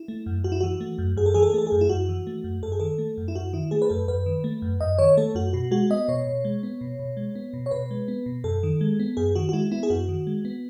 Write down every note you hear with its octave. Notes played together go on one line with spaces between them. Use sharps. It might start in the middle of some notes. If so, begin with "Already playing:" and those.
Already playing: E4
A3
F#2
F#2 F#4
E4
E3 F#4
A3
F#2
F#2 G#4
A4
E3 G#4
A4
G#4
A3 A4
G#4
F#2
E4
F#2 F#4
E3
A3
F#2
F#2 A4
G#4
D#3 A4
A3
F#2
E4
F#2 F#4
D#3 E4
A3 G#4
B4
F#2 A4
F#2 B4
D#3
A3
F#2
F#2 D#5
D#3 C#5
A3 A4
F#2 F#4
B2 F#4
G#3 F#4
B3 D#5
B2 C#5
B2
G#3
B3
B2
B2
G#3
B3
B2
C#5
B2 B4
G#3
B3
B2
F#2 A4
D#3
G#3
B3
F#2 G#4
D#3 F#4
F#4
G#3 E4
B3 E4
G#4
F#2 F#4
D#3
G#3
B3